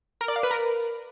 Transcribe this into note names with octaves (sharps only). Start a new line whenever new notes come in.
A#4
D5
F5
B4
A#4